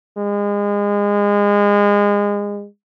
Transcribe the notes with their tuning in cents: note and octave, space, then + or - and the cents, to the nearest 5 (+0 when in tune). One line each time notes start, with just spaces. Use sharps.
G#3 -30